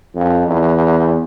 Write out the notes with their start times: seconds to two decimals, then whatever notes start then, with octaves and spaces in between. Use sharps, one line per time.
0.15 F2
0.47 E2